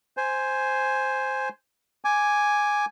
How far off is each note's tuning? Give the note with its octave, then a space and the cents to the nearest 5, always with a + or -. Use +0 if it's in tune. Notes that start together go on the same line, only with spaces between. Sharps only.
C5 +0 G#5 +0
G#5 +0 D6 +0